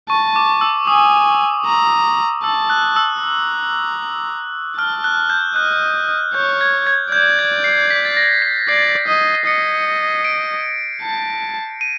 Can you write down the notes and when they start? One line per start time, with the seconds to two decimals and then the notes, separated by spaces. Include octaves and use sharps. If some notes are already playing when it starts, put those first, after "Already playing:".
0.10 A5 C#6
0.36 D6
0.61 E6
0.87 G#5 D#6
1.66 A#5
2.43 A5 E6
2.70 F#6
2.96 E6
3.22 A#5
4.78 A5 F6
5.04 F#6
5.30 G6
5.56 D#5 F#6
6.34 C#5 G6
6.61 G#6
6.87 G#6
7.12 D5 G6
7.39 G#6
7.64 C7
7.90 B6
8.05 A6
8.17 A#6
8.42 B6
8.68 D5 C7
9.07 D#5
9.46 D#5 C#7
10.25 D7
11.02 A5
11.81 D#7